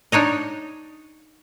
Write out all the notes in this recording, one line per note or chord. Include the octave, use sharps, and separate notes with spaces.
D4 D#4 C#5 D#5